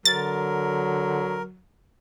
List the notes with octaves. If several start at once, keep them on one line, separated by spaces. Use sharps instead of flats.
D3 F#3 A#4 A6